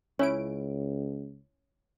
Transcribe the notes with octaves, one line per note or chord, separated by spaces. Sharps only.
C#2 C#4 E4 C#5 D7